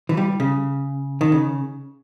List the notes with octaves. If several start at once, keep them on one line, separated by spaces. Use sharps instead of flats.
E3
G3
C#3
D#3
C#3